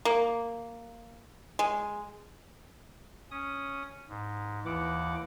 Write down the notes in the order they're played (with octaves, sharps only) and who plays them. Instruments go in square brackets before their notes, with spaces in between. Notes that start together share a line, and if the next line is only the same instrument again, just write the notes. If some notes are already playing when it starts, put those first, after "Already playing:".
[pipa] A#3
G#3
[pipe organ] C#4 D#6
G#2
[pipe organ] D#2 F#5 D6 [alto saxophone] E3